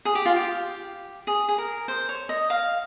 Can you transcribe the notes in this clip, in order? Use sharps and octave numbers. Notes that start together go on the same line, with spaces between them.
G#4
G4
F4
G4
G#4
G#4
A#4
C5
C#5
D#5
F5